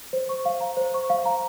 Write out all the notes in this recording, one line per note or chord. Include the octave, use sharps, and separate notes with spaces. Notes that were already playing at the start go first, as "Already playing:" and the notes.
C5
C#6
F5
A#5
C5
C#6
F5
A#5